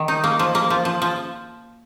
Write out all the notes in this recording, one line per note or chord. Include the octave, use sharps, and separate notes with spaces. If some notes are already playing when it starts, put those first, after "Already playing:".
Already playing: D#3
D#4
A#3
F3
A#3
F3
F3
F3